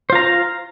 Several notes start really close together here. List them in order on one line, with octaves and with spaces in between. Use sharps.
C5 F4 A#5 F5